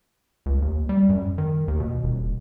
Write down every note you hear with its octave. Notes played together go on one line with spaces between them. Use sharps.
C#2
D#2
G3
F#2
D#3
D#2
B2
D#1